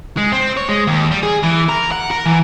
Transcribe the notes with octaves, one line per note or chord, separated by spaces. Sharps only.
G#3
C4
C#5
G#3
D#2
G3
G#4
E3
A#4
F#5
A#4
E3